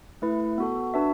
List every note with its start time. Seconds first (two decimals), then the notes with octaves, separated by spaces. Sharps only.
0.22 A3 E4 B4
0.58 B3 F#4 A4
0.94 D4 F#4 B4 E5